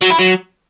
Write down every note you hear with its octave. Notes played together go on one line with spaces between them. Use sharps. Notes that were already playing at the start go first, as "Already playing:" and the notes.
F#3
E4
F#3